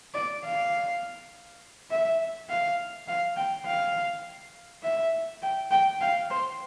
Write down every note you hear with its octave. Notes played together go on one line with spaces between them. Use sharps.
D5
F5
E5
F5
F5
G5
F5
E5
G5
G5
F5
C5